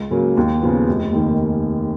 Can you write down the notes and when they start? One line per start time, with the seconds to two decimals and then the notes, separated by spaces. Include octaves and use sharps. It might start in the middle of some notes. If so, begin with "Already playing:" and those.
Already playing: C#2
0.11 C#3 F#3 A#3
0.37 D#2
0.61 C#3 F3 B3
0.88 F1
1.12 D#2 D#3 A#3